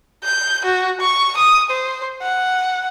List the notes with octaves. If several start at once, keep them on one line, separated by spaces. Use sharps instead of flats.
G6
F#4
C#6
D#6
C5
F#5